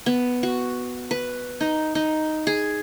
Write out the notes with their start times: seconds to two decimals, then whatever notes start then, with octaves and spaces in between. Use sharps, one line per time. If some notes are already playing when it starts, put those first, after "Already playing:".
0.06 B3
0.43 F#4
1.11 B4
1.61 D#4
1.95 D#4
2.47 G#4